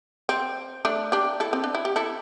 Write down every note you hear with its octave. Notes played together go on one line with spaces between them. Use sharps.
C4
A3 D4
D4 G4
E4 A4
C4
D4
E4
G4
E4 A4